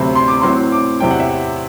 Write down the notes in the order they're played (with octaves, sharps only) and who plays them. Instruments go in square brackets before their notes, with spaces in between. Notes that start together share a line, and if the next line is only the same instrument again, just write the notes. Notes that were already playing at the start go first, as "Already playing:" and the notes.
Already playing: [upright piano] D2 C3 F#3 C4 B5
C6
D6
A2 F#3 C4 C6
D6
E2 C3 F#3 C4 E4 G5
F#5
E5